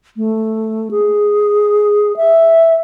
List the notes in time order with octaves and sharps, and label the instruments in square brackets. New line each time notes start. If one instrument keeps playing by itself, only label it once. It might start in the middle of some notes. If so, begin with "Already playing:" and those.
[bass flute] A3
G#4
E5